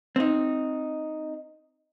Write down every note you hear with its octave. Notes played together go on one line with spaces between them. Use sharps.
C4 D#4